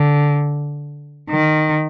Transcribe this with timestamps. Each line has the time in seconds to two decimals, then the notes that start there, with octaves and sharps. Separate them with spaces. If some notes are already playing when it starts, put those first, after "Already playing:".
Already playing: D3
1.30 D#3